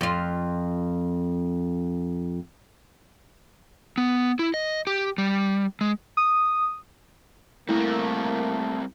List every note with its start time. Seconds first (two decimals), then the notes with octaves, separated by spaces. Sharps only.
0.01 F2 F4
3.98 B3
4.39 E4
4.54 D#5
4.87 G4
5.18 G3
5.81 G#3
6.17 D#6
7.69 G3 A3 A#3 C4 E4 A#4